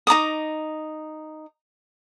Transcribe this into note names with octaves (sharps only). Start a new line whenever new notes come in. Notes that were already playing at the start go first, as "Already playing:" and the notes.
D#4 A#5 D6 D#6